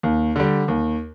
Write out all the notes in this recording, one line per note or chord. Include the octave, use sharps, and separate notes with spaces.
D#2
D3 G3
D#2